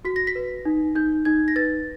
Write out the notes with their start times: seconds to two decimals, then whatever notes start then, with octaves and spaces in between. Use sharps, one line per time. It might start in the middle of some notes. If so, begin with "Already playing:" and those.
0.05 F#4 B6
0.16 A#6
0.27 B6
0.35 B4
0.65 D#4
0.95 D#4 G6
1.25 D#4 G#6
1.48 A#6
1.56 B4 A6